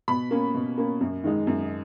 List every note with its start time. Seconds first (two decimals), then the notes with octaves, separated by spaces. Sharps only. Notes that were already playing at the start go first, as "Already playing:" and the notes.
0.08 B2 B5
0.31 A#3 C#4
0.54 B2
0.78 A#3 C#4
1.00 F#2
1.24 D#3 G#3 D#4
1.47 F#2